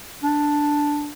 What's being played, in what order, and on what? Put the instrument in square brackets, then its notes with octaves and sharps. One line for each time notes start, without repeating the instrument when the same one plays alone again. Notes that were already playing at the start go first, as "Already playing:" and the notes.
[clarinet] D4